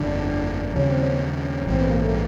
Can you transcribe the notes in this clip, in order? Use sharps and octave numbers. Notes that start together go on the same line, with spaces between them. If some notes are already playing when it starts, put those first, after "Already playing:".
Already playing: G1 F2 D3 D4
D#2 C#3 F3 C#4
C4
C#4
A#1 G#2 E3 C4
B3
A#3
A3
G#3